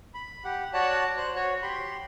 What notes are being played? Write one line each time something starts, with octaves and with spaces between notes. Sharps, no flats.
B5
G4 F#5
F#4 C#5 D5 F#5 A5 F#6
C5 F#6
F#4 C#5
G4 B5 C6